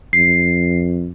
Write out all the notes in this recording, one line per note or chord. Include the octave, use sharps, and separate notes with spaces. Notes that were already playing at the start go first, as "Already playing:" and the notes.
F2 C7